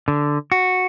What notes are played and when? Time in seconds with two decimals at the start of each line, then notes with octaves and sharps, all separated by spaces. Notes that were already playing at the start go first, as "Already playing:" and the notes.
0.08 D3
0.52 F#4